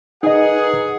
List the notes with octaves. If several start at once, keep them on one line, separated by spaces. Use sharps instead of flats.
D#4 G#4 A#4 B4 D#5 F#5